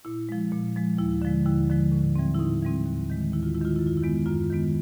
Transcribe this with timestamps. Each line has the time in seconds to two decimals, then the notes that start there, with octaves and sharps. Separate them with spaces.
0.05 A#2 E4
0.29 F3 G#3
0.52 A#2
0.76 F3 G#3
0.98 D#2 E4
1.22 D3 F3 G#3
1.45 D#2 E4
1.70 D3 F3 G#3
1.92 A2
2.16 E3 G3 C4
2.34 E4
2.39 A2 D#4
2.63 E3 G3 C4
2.86 D#2
3.10 D#3 G#3
3.32 D#2 E4
3.43 F4
3.54 G#3 E4
3.61 D#3 F4
3.76 F#2 E4
3.87 F4
3.97 E4
4.03 D#3 G#3 B3
4.26 F#2 F4
4.50 D#3 G#3 B3